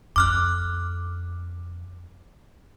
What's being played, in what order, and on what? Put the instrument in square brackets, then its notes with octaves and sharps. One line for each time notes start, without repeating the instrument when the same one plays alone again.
[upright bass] F2 [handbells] D6 F6 F#6